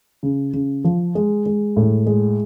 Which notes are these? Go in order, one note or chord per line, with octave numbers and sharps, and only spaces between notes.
C#3
C#3
F3
G#3
G#3
A2
G#3